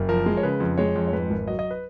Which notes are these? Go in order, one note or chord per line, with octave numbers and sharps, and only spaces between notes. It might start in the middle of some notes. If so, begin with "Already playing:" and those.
Already playing: F#1
F3 A#4
G#3
C#5
C#3 B4
F2
G#3 C#5
F2
C#5
G#2 B4
G#1
F#3 D#5
D#5
B4